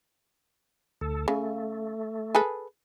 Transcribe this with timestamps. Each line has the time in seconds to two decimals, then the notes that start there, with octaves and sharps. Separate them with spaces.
1.01 D2 A4
1.28 C#3 A3
2.35 G#4 A4 B4